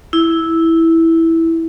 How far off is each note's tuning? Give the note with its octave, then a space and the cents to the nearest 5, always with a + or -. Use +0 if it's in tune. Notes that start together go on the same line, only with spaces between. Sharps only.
E4 -10